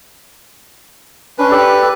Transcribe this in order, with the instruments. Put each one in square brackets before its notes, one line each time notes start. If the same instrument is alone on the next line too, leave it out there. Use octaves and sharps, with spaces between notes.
[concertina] C#4 D4 [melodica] B4
[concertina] G4 A4 D5